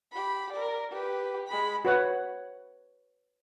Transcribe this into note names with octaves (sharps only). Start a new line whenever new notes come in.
G4 B5
A#4 D5
G4 B4
G#3 B5
F#4 B4 C#5 F#5